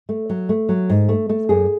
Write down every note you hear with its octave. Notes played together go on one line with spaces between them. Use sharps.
A3
F#3
A3
F#3
G#2
A3
A3
F#2 G#4